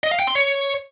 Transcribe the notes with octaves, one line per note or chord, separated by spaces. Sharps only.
D#5
F5
G5
C6
C#5